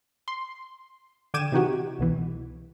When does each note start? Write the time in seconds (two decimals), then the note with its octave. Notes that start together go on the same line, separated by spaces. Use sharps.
0.28 C6
1.34 D3 G5 D6 G#6 D#7 E7
1.52 C3 E3 D#4 F#4 G4
1.99 C2 B2 E3